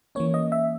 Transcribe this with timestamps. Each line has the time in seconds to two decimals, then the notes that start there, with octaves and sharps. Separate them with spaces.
0.15 E3 A#3 C#4 C#5
0.34 D#5
0.52 E5